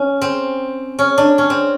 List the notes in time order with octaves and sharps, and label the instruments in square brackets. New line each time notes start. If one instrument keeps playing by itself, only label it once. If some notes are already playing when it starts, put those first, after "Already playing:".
Already playing: [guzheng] C#4
C4
C#4
D4
C#4
C4